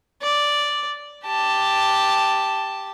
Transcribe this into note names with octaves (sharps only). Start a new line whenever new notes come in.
D5
G4 A5